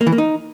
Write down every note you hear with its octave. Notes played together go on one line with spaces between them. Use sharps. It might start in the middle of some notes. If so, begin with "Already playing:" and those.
A#3
E3
A#3
D#4